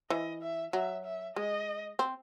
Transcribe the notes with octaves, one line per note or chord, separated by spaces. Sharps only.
E3 D#5
E5
F#3 E5
E5
G#3 D#5
C4